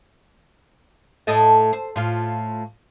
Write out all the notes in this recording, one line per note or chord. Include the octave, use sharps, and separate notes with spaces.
A2 A4 D#5
C5
A2 F4